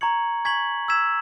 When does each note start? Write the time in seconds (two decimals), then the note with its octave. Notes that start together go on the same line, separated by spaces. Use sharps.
0.01 A#5 C#6 G#6 C#7 F#7
0.45 G#5 C#6 G#6 B6 F#7
0.88 E6 G#6 B6 E7